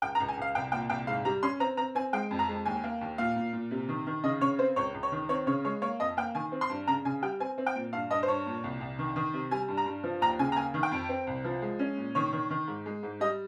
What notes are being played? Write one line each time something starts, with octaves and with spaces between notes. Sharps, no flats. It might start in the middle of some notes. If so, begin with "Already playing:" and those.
C#2 G5
A#5
C#2
G#5
C#2 F5
C2 G5
A#2 G5
C2 G5
G#2 F5
G3 A#5
C#4 C6
C4 A#5
C4 A#5
C4 G#5
G#3 G5
F2
A#5
G#3
D#2 G#5
A#3
D#2
A#2 F5
A#2
A#2
C3
D#3
D#3
C#3 D#5
C#3 C#5
C4 C5
C#2 C#5
C#2
C#5
D#3
C4 C#5
C#3 C#5
G#3 C#5
A#3 C#5
F2 D#5
A#3 G5
D#3 G#5
C4
C6
G2
C#3 A#5
C#3 G#5
G3 G5
C4 G#5
C4
G5
A#2
G2 F5
G2 D#5
C5
G2 C#5
A#2
C2
C2
D#3
D#3
C3
G3 G#5
G2
A#5
G2
F3
D#2 A#5
C#3 G#5
A#5
A#3 G#5
D#3
G5
F2
C4
C2
F3
G#3
C#4
A#2
D#3 C#5
D#3
D#3
G#2
G#3
G#2
G3 D#5